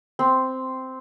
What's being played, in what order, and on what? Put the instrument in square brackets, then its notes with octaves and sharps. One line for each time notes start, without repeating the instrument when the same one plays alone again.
[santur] C4